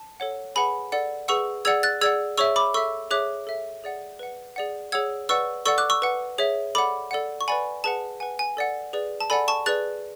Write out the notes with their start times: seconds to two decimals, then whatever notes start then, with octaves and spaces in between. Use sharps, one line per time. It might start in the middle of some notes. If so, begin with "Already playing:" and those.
Already playing: A5
0.20 A4 C#5 F#5
0.56 G#4 B4 F#5 G#5 B5
0.92 A4 D5 F#5
1.28 G#4 B4 F#5 C#6 E6
1.65 G#4 D5 F#5 E6 G#6
1.83 F#6 A6
2.01 G#4 D5 F#5 E6 G#6
2.37 G#4 C#5 E5 C#6 E6
2.56 B5 D6
2.74 A4 E5 C#6 E6
3.11 G#4 C#5 E5 D6 F#6
3.47 A4 E5
3.84 G#4 D5 F#5
4.19 B4 F#5
4.56 G#4 D5 F#5
4.92 G#4 C#5 F#5 E6 G#6
5.29 B4 D5 F#5 C#6 E6
5.66 A4 D5 F#5 C#6 E6
5.78 D6 F#6
5.90 C#6 E6
6.02 B4 F#5
6.38 G#4 C#5 E5
6.75 A4 D5 F#5 B5 D6
7.11 A4 D5 F#5
7.41 C#6
7.48 B4 D5 F#5 G#5 B5
7.84 G#4 B4 F#5 A5
8.20 B4 F#5 G#5
8.39 G#5
8.57 A4 D5 F#5
8.93 G#4 B4 D5
9.20 A5
9.30 A4 D5 F#5 G#5 B5
9.48 A5 C#6
9.66 G#4 B4 D5 F#6 A6